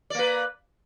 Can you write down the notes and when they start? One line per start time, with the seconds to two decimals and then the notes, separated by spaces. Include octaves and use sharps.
0.10 D5
0.15 A#3
0.19 B4